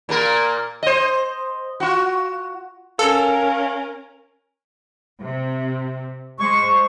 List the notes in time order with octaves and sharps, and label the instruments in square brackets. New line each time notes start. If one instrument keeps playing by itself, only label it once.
[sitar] A#2 A#3 A#4
C5 D#5
F4 F#4
[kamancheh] C#4 A#4 [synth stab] A4 [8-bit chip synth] F5
[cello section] C3
[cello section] G#3 C5 [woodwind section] C#6